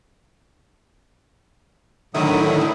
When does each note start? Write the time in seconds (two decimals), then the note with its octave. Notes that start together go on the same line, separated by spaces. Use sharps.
2.14 A2 D3 D#3 F#3 E4 D#6